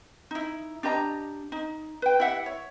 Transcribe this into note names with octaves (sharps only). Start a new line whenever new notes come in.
D#4 E4
D4 G4 D#5 A#5
D#4
B4 G5
E4 G4 E5 F#5
C#5